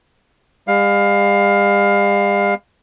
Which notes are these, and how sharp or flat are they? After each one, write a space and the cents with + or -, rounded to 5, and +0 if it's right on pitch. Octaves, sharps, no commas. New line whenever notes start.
G3 +45 F5 +15